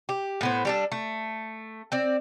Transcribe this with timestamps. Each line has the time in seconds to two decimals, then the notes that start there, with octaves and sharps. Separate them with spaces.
0.09 G4
0.41 A2 B3 C5
0.65 G3 D4 A4
0.92 A3
1.92 C4 D5